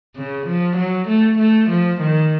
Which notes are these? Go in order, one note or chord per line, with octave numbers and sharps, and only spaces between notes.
C#3
F3
F#3
A3
A3
F3
D#3